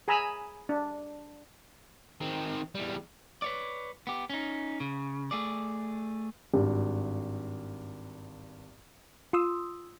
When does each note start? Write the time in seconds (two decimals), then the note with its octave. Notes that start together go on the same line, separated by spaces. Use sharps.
0.08 G#4 G#5 A#5 B5 E6
0.69 D4
2.21 D#3 C4
2.75 E2 G3
3.42 B4 C#5 D5
4.07 B3 G4
4.30 C#4 D#4
4.80 C#3
5.31 A3 G#4 D5
6.54 G#1 G2
9.33 F4 C6 D#6 E6